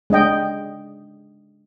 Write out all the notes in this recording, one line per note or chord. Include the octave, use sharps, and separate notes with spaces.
G#3 D4 D#5 G5